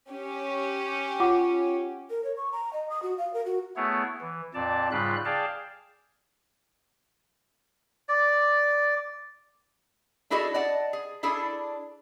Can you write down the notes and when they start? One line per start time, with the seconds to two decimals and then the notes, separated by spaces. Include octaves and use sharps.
0.11 C#4 G4
1.20 F4 F#5 D6
2.10 A#4
2.24 C#5
2.37 C#6
2.52 A#5
2.73 D#5
2.90 D#6
3.03 F#4
3.18 F5
3.34 A#4
3.46 F#4
3.76 A3 B3 E4 G#4 C#5
4.21 E3
4.54 F2 A#2 D5 A5
4.91 G#2 C#3 G3 F4 B5 F#6
5.25 G#4 D5 F5 G5 A5
8.09 D5
10.30 D4 E4 F#4 G#4 A4 D#5
10.54 D5 D#5 F#5 A5
10.93 G#4
11.23 D4 E4 G#4 A4